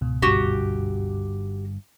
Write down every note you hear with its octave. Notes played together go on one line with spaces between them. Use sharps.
C#2 G#2 B2
G1 G2 F#4 G4